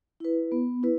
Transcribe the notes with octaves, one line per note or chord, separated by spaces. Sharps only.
E4 B4
B3
E4 B4